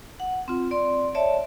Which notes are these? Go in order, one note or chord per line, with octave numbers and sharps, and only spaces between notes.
F#5
C4 F4
D5 C6
C#5 D5 E5 A5